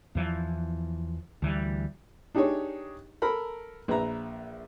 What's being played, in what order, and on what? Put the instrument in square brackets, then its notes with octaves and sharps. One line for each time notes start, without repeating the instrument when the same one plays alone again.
[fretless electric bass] E2 E3 F3
D2 E3 F3 G3
[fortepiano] D4 D#4 G4 G#4 C#5
A4 A#4 A#5 B5
A#1 B4 E5 A#5